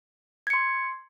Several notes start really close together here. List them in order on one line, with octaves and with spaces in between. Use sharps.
G#6 C#7 C6